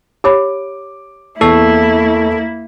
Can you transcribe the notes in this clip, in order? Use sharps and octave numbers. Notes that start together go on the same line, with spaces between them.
G4 C#5 B5 D6
E2 A#3 E4 A4 C#6 C7